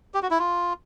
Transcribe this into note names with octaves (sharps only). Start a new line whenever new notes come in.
G4
F#4
E4
F4